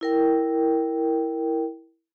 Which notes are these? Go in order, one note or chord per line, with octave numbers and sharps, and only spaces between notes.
E4 A#4 G5